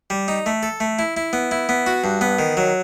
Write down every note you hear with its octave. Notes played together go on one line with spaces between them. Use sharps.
G3
D#4
A3
A4
A3
E4
E4
B3
E4
B3
F#4
G2
B3
D#3
F#3